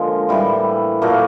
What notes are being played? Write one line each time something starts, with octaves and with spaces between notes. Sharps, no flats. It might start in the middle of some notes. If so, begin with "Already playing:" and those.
Already playing: D3 F3 G#3 A#3
A2 E3 G3
A#2 F#3 A3 A#3